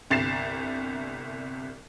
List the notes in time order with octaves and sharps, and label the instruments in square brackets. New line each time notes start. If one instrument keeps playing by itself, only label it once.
[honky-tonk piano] G1 C2 A6 C7 E7